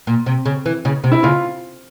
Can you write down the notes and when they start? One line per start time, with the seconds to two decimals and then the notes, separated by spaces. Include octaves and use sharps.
0.07 A#2
0.26 C3
0.46 C#3
0.66 E3
0.85 C#3
1.04 C3
1.12 E4
1.23 C#3 F4